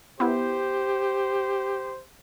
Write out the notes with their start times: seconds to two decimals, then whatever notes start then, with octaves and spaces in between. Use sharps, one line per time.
0.20 B3 E4 G4 C5